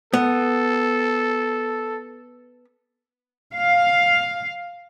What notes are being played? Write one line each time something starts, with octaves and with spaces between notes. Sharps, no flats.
B3 A4
F5